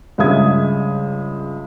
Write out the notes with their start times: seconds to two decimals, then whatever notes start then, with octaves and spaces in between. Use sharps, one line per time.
0.18 C#2 G2 G#3 E5 D#6 G#6